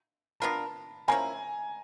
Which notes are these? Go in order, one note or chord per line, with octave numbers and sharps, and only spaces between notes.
B3 D4 F4 A#4 A5 B5
F3 A#3 C#4 E4 G#5 A#5